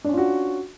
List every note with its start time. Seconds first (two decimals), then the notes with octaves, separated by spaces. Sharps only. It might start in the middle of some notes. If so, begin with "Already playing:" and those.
0.04 D4
0.09 C#4
0.13 F4
0.18 F#4